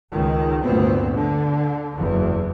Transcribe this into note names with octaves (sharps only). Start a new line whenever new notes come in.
C#2 D#3
G1 D2 A#2 B3 C4
D3
F#1 E2